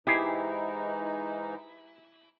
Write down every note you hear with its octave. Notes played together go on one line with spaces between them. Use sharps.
G#2 E3 D#4 E4 G4 G#4